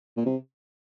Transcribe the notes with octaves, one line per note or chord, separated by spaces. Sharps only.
A#2
C3